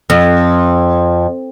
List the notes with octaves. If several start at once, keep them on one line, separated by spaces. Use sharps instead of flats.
F2